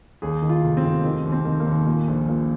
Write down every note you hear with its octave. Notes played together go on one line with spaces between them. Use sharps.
D#2 G#4
D#3
F4
F1
C4
F1
D#3 C4
D#2
C4
D#3
A#3
D#2
A#2
A#1
A#2